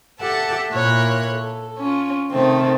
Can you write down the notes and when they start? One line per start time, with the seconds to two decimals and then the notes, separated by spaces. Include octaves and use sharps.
0.21 G4 A4 E5 F#5 A5
0.70 A#2 E4 A#4 C#5 F#6
1.32 A4
1.78 C#4 F4
2.32 C3 D#3 A3 C4